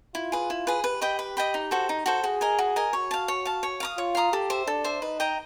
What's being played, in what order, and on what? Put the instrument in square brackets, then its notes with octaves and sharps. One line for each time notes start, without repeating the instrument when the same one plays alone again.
[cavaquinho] E4 [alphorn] F4
[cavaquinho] G#4 B4
E4
G#4 B4
[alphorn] G4 [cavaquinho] B4
[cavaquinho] D#5 G5 B5
B4
D#5 G5 B5
D#4
F#4 A4 C5
D#4
F#4 A4 C5
[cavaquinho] F#4 [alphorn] G#4
[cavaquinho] A#4 D#5 G#5
F#4
A#4 D#5 G#5
[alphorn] F#4 [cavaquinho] C#5
[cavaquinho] F5 A5
C#5
F5 A5
C#5
F5 A#5 D#6
[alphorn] F4 [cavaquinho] C#5
[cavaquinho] F5 A#5 D#6
[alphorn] G4 [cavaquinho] A4
[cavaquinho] C5 E5
[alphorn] D4 [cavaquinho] A4
[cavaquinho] C5 E5
[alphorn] D#4 [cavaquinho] B4
[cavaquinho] D#5 G5 A#5